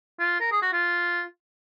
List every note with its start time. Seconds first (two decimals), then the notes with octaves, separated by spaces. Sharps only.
0.19 F4
0.40 A#4
0.51 G#4
0.62 F#4
0.73 F4